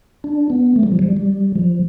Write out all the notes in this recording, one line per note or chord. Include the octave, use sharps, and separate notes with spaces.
D4
B3
A3
G3
F3
G3
G3
F3